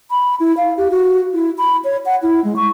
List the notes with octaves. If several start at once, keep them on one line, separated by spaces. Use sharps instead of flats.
B5
E4
F5
G4
F#4
E4
B5
C#5
F#5
E4
G#3
C#6